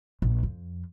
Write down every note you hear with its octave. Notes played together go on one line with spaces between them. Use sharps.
A#1
F2